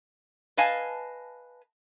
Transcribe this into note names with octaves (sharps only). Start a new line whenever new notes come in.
B4 D#5 F5 G#5 A5